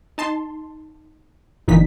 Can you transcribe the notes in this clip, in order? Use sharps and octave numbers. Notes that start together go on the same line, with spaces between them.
D#4 A5 C6
G1 F#2 A#2 E3 D#4 B6